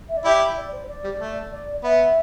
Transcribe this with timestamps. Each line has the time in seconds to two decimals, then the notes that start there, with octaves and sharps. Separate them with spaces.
0.09 E5
0.17 D5
0.25 E4 G4 E5
0.57 D5
0.72 C5
0.88 D5
1.04 G3
1.20 A3
1.51 D5
1.83 B3 E5